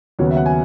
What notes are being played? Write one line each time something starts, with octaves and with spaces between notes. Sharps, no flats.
D#2 C#3 F#3 B3 C#5
E5
F#5
G#5